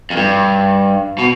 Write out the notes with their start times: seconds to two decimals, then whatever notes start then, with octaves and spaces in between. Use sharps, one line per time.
0.10 F2
0.16 G2
1.18 B2